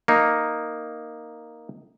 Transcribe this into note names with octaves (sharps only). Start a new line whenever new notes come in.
A#3 D#4